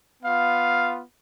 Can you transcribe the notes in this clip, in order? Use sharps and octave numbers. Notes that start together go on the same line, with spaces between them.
B3 F4 F5